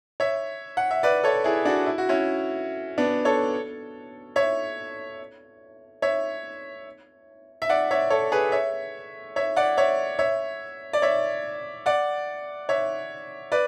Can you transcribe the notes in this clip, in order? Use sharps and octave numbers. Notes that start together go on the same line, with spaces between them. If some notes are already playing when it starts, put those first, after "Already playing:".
C#5 E5
F#5
E5
B4 D5
A4 C#5
E4 G#4
D4 F#4
E4
F#4
C#4 E4
B3 D4
A4 C#5
C#5 E5
C#5 E5
E5
D5 F#5
C#5 E5
A4 C#5
G#4 B4
C#5 E5
C#5 E5
D5 F#5
C#5 E5
C#5 E5
D5
C#5 E5
D5 F#5
C#5 E5
B4 D5